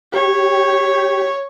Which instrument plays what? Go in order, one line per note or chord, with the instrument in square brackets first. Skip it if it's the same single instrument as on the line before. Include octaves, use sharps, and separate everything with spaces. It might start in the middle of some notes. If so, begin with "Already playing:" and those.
[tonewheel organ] G4 [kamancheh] C#5